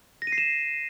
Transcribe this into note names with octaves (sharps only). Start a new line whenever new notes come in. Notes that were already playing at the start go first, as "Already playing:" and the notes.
A#6
D#7
C7
E7